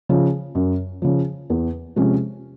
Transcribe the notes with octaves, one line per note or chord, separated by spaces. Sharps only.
C#3 F3
F#2
C#3 F3
E2
C3 F3 G#3 C#4